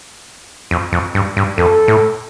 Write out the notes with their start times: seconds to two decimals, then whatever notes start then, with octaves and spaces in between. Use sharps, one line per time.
0.71 F2
0.92 F2
1.15 G2
1.37 G2
1.58 F2 A4
1.88 A2